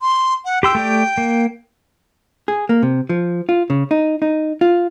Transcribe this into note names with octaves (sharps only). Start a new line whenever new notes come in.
C6
F#5
G4 G5 C6 E6
A3 G4 D5
A#3
G#4
A#3
C3
F3
F4
C#3
D#4
D#4
F4